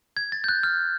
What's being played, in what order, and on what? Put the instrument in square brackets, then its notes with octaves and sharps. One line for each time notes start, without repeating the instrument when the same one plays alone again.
[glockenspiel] G#6
A6
G6
F#6
F6